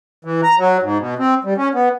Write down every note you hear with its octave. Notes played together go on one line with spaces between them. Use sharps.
E3
A#5
F#3
G#2
B2
C4
G3
C#4
B3